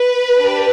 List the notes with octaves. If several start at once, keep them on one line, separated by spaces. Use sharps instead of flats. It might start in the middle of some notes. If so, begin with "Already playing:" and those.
Already playing: B4
D4 G4